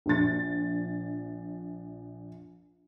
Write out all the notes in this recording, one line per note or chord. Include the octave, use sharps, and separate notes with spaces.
A#1 D4 A6